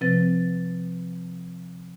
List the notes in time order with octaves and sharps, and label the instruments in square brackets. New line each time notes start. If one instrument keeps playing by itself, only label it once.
[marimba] C3 F3 C4 B4 A6